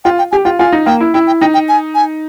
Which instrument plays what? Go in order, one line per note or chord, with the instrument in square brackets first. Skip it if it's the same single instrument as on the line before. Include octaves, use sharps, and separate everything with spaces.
[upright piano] F4 [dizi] G5
[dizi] G5
[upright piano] G4 [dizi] G#5
[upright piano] F4 [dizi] G5
[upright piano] F4 [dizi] G#5
[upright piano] D#4
[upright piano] A#3 [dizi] G5
[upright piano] E4
[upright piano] E4 [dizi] G5
[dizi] G5
[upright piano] D#4 [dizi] G5
[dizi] G5
G#5
G#5